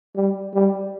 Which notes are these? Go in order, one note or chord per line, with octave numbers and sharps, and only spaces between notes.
G3
G3